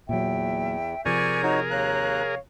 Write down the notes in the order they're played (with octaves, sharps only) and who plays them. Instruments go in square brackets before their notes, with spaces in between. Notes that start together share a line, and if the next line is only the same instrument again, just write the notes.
[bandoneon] E2 [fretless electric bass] A#2 F#3 [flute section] E5 G5
[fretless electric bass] C3 F3 [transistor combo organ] G#4 A#4 [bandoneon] D5 G#5 C#6 [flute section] G6
[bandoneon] D#4 F#4 C#5
[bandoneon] D#2 A#5 F#6 [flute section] C#5 F5